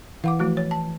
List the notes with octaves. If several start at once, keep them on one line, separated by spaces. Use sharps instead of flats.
E3 F5 F#5 D6
F3 A3 F#4
C#5
A5